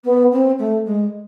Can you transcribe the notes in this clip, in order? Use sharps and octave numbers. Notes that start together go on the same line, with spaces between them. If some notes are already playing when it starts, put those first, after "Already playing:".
B3
C4
A3
G#3